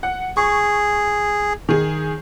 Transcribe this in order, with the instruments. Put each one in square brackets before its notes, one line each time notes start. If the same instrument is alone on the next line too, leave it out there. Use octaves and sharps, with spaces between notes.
[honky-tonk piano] F#5
[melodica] G#4 [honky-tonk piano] C#6
[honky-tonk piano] D#3 G#4